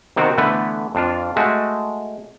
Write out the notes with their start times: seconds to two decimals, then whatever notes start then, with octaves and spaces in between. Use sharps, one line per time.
0.16 C3 D#3 B3 C4 F#4
0.38 D3 E3 A3 B3 B4
0.95 F2 D4 F4
1.36 G#3 A3 F#4